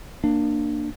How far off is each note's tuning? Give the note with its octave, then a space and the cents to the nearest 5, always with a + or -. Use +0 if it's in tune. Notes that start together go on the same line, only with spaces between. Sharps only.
A#3 +0 D4 +20